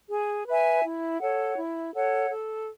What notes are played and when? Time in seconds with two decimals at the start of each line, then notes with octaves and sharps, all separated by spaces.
0.10 G#4
0.46 B4 E5 G#5
0.83 E4
1.20 A4 C#5 F#5
1.57 E4
1.94 A4 C#5 F#5
2.30 A4